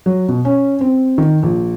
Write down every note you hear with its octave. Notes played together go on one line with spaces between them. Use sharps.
F#3
B2
C#4
C4
D#3
A#1